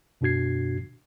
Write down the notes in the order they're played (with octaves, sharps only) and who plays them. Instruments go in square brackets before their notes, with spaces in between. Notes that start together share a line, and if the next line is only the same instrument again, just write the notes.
[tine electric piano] F#2 B2 D4 F#4 G#6 C7